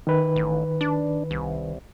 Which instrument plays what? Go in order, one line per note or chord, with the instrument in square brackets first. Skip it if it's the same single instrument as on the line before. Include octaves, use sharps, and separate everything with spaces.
[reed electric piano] D#3 B4
[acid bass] A1
D4
C2